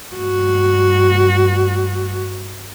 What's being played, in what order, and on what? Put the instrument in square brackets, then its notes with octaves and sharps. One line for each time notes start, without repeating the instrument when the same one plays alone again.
[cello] G2 F#4